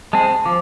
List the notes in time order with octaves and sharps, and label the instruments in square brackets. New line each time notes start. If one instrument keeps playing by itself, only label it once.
[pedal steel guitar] G#3 C4 G#4 [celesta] A5
[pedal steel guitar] F3 [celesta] D6